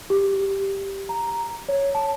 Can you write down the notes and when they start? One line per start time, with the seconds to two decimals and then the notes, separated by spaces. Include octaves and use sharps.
0.10 G4
1.09 A#5
1.69 C#5
1.95 A5